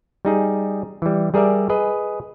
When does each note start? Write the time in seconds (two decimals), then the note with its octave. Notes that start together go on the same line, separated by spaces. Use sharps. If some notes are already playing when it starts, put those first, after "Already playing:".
0.25 G3 D#4 G#4
1.02 E3 G3
1.34 G3 G#4 A#4 D5 E5
1.69 G#4 B4 D#5